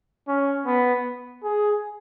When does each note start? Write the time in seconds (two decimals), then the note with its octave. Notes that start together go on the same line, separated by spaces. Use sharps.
0.27 C#4
0.66 B3
1.44 G#4